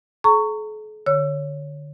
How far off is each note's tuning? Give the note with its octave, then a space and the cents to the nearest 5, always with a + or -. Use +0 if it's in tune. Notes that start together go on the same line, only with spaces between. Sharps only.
A4 -45 A#5 -30 C#6 +10
D3 +15 C#5 +0 E6 +25